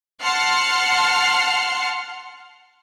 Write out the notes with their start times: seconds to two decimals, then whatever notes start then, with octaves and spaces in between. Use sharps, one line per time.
0.23 F#5 A5 C6 F6 C7 C#7